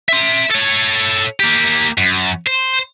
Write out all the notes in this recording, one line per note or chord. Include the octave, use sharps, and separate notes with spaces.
E5 C6
A4 C#5
A#3 G4
F#2
C5